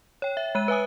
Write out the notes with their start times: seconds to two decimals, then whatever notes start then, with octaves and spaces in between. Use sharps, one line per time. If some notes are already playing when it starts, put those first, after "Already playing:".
0.22 C#5 G5
0.37 E5
0.55 G#3 F#6 D#7
0.68 B4 E5 G#5 D#6